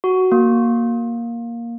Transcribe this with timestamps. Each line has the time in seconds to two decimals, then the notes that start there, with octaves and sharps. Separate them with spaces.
0.04 F#4
0.32 A#3